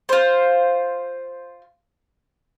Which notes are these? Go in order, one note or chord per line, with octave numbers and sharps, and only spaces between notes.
F4 C5